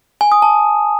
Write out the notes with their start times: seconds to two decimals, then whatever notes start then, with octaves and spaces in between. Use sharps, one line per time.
0.21 G#5
0.32 D#6
0.42 A5